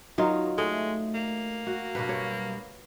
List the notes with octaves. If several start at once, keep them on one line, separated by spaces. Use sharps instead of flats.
D#3 F#3 D#4 F4
G#3 A3
A#3
F#4
G2 B2 F#3 B4
C#5